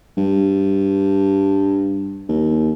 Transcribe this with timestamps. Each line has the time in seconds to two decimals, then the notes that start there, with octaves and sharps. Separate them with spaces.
0.17 G2
2.29 D#2